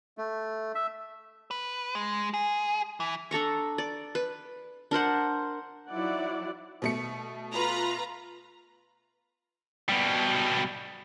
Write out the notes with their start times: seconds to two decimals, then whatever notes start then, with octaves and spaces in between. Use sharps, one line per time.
0.18 A3
0.75 E5
1.51 B4
1.95 G#3
2.34 G#4
3.00 E3
3.31 D4 A4 A#5 C#6
3.78 D5
4.15 B4
4.91 D4 A#4 C5 F#5
5.89 F3 F#3 D#4 E4 D5 F#5
6.82 B2 A3 C#7
7.53 F4 B4 A#5
9.89 B2 G3